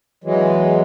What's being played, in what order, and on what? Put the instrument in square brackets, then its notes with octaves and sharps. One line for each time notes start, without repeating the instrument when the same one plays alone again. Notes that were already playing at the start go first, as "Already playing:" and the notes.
[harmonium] E2 E3 F#3 G#3